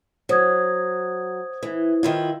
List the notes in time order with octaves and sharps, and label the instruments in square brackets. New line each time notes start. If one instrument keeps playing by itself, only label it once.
[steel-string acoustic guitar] F#3 [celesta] C5 D#6 G#6
[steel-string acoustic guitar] E3
D#3 E4 F4